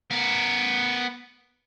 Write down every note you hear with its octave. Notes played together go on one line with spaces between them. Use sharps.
B3 A#4